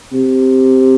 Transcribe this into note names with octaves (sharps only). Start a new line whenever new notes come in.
C3